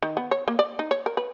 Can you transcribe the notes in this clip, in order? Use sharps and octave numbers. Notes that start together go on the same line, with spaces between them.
D#3
B3
C#5
A#3
D5
D#4
C#5
A#4
B4